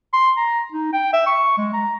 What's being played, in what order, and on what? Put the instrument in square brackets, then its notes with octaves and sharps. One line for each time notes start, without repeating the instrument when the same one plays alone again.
[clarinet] C6
A#5
D#4
G5
E5
C#6
G#3
A#5